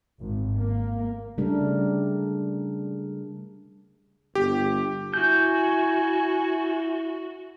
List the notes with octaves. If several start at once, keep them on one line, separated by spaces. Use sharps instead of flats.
G#1
A#3
C#3 G3 A3 D4 A#4
G1 G4
E4 F#4 G#5 G6